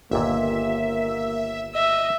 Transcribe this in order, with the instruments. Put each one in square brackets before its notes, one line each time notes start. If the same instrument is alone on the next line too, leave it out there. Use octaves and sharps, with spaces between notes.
[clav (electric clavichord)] G1 D#2 A#2 [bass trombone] A#3 [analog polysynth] E5
[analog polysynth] D#5 [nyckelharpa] E5